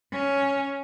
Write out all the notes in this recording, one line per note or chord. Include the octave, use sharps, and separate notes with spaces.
C#4